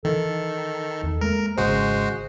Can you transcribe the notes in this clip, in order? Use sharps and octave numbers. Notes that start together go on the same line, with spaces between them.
D#3 E3 A4
E2
G#3 A#3 A#4
G#1 C#3 G#3 F#4 C5